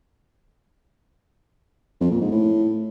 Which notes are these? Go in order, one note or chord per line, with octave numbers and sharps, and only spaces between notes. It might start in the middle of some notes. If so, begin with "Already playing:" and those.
F2
A#2
G#2
A2